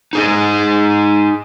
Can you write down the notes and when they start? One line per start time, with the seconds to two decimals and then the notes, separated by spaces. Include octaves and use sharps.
0.13 D#4 G#4 D#5